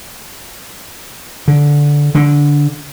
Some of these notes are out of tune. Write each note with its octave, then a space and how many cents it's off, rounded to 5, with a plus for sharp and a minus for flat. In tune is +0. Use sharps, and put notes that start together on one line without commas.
D3 -10
D3 -10